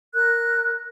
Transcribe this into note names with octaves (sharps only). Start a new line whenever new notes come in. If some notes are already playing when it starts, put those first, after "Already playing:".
A#4 F#6